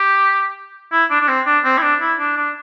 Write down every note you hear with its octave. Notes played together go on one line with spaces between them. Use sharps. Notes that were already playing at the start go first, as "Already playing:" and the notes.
Already playing: G4
E4
D4
D4
C4
D4
C4
E4
D4
E4
D4
D4